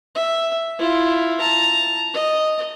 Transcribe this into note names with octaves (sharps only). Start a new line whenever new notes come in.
E5
E4 F4
A5 A#5
D#5